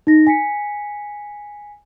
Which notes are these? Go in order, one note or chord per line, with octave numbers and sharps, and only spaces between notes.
D#4 A#6
G#5 B6 C#7